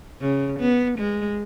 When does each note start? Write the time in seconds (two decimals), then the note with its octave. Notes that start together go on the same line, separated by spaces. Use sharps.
0.21 C#3
0.60 B3
0.98 G#3